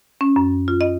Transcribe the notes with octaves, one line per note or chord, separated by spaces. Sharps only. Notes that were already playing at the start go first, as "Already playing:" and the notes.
C#4
F#2
F4
D#5